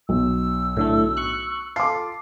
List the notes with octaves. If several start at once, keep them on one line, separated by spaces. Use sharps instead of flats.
B1 E6
A2 D3 A3
C#6 F#6
F4 A4 D6 C7